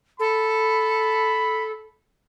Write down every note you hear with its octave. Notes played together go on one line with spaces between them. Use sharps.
A4 B5